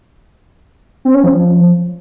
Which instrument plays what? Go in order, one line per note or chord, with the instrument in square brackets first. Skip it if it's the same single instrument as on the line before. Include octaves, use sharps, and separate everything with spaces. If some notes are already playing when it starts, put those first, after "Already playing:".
[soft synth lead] C4
C#4
F3